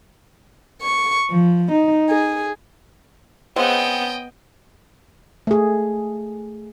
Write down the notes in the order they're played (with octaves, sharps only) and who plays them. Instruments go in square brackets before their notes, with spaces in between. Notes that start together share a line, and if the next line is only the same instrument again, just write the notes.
[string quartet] C#6
F3
D#4
G#4
[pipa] C#3 G#3 C4 [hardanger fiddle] B3 [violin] D#5 G5
[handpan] A3 G#4